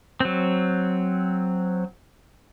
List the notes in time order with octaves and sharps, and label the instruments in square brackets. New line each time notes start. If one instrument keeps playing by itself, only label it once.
[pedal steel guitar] F#3 C4